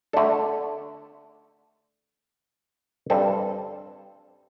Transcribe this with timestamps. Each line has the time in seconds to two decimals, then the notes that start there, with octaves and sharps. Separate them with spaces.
0.13 D3 A3 D4 A4
3.10 G2 G3 C4 A4